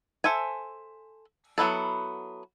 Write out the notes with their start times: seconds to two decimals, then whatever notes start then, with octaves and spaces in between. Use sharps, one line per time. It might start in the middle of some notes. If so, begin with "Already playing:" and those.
0.24 A4 C5 E5 G#5
1.58 F#3 B3 E4 A4